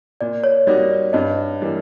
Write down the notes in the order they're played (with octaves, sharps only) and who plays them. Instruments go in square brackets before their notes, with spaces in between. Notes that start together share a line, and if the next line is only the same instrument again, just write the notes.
[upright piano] A#2 [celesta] D5
[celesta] C#5
[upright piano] G3 A#3 D#4 F#4 [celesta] D5
[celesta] D5
[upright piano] G2 [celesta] D#5
[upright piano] E3 G3 A#3